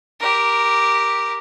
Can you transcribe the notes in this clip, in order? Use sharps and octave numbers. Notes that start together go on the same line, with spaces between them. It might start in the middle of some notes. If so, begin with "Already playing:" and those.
G4 A#4